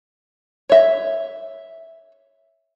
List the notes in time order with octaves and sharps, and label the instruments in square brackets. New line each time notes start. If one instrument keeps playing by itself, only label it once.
[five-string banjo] C#5 E5